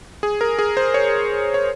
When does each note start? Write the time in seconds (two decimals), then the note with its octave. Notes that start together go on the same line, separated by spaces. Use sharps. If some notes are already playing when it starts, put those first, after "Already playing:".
0.23 G#4
0.41 A#4
0.59 G#4
0.77 C5
0.94 C#5
1.54 C#5